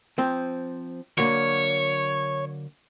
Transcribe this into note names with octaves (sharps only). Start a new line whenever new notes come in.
F3 C4
D3 F#3 A#3 C#5